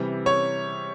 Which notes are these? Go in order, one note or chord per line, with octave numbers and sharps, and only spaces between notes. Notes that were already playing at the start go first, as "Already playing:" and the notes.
Already playing: C3 E3 G3
C#5